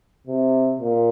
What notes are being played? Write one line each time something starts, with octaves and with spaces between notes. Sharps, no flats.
C3
A#2